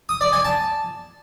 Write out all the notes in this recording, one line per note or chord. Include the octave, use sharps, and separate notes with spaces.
D#6
D5
G#5
A5